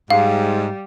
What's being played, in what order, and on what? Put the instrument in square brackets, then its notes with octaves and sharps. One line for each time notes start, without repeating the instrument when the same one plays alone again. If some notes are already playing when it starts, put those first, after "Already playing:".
[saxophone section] G#2 [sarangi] G3 [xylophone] F5